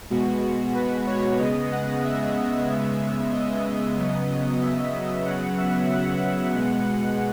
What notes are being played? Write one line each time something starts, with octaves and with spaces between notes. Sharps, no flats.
B2 G#3 B3 F#4
B4
C#5
C#3 G#3 B3 D#5
F#5
E5
C#3 G#3 B3
D#5
C#3 F#3 B3
E5
E5
C#3 F#3 B3 F#5
E5
F#5
B2 G#3 B3